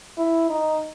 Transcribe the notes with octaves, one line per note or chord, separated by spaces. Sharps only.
E4
D#4